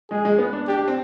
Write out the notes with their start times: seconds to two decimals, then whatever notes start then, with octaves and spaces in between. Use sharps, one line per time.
0.10 G#3 G#4
0.25 G#3
0.38 B3
0.53 D4
0.68 D4 G4
0.78 D4
0.88 C4